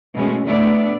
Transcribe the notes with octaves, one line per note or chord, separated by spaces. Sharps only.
B2 E3 G#3 A3 C#4
D2 A2 B3 D4 D5 E5